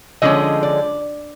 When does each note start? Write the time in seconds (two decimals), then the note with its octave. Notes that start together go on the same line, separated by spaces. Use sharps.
0.22 D3 F3 G#3 C#4 D#5
0.63 D5